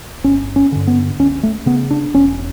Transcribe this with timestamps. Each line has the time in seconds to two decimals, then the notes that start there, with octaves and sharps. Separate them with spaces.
0.24 G1 C#4
0.56 C#4
0.72 G2 D3
0.87 B3
1.19 C#2 C#4
1.43 A3
1.66 C#3 B3
1.91 D4
2.14 E1 C#4